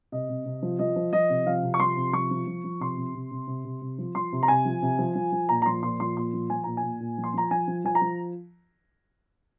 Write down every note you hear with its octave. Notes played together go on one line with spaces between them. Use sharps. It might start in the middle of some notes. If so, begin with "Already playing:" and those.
C3 D#5
C3
C3
F3
F3 D#5
F3
F3 D#5
C3
F3 F5
C3
C#6
F3 C6
C3
F3 C#6
F3
F3
F3
C3 C6
C3
C3
C3
C3
C3
C3
F3
F3 C6
C3
A#5
C3 G#5
F3
C3
F3
F3
F3
A#2 A#5
A#5
F3 C6
A#2 C6
F3 C6
A#2 C6
F3
F3 G#5
A#2 A#5
G#5
A#2
A#2
F3
C6
F3 A#5
F3 G#5
F3
F3 G#5
A#5
F3